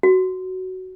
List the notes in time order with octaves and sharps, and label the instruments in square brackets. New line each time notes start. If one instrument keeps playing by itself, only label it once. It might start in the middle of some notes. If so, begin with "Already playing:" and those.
[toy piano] F#4